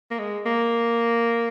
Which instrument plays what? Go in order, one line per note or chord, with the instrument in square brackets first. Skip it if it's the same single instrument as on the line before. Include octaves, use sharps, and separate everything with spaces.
[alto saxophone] A#3
G#3
A#3